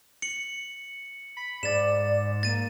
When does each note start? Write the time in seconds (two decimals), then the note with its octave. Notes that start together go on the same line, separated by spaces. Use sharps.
0.22 C#7 F#7
1.37 B5
1.63 G#2 D5 A6 E7
2.43 A#3 A6 D#7